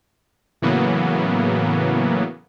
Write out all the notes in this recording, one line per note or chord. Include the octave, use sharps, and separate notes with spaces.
A2 C#3 E3 F#3 A#3 B3